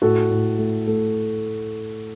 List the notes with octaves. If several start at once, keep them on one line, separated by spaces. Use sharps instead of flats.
A2 F#4 A4
A2
A3
A3